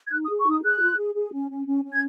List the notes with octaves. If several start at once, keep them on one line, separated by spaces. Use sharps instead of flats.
G#6
D#4 F#6
D#6
G#4
C#6
D#4 D#6
G#4 F#6
F4
G#4
G#4
C#4
C#4
C#4
C#4
G#6